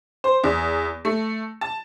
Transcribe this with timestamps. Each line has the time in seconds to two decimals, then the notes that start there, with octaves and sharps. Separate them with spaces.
0.24 C5
0.44 E2
1.05 A3
1.61 A5